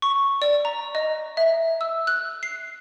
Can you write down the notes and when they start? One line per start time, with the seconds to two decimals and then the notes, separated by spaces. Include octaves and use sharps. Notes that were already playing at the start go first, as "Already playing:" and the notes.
0.02 C#6
0.42 D5
0.65 A#5
0.95 D#5
1.37 E5
1.81 E6
2.07 F#6
2.43 C7